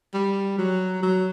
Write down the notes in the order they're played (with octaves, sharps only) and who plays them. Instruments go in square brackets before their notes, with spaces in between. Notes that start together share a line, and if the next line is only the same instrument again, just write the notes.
[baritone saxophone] G3
F#3
F#3